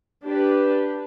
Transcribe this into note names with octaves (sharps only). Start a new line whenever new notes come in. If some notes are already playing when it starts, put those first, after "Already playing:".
D4 G4 B4